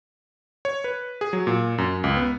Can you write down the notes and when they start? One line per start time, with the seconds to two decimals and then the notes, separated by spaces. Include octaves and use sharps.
0.65 C#5
0.84 B4
1.21 G#4
1.33 F#3
1.47 A#2
1.78 F#2
2.04 C#2
2.17 B3